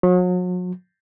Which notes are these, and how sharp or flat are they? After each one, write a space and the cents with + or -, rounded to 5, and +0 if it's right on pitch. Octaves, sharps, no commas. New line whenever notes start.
F#3 -40